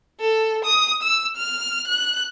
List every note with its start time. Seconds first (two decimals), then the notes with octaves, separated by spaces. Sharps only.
0.21 A4
0.65 D#6
1.03 E6
1.37 F6
1.88 F#6